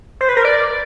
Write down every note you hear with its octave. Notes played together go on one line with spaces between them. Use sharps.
C5
B4
A#4
D5